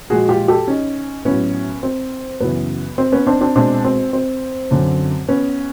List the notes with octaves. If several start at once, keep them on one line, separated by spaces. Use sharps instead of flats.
A#2 F3 G#3 F#4 G#4
F4 G4
G4 A4
C#4 D#4
A2 F#3 B3 C#4
C4
F#2 C#3 E3 B3
C4
B3 C#4
C4 D4
C4 D4
B2 G#3 C4 D4
C4
C4
F#2 D3 F#3
B3 C#4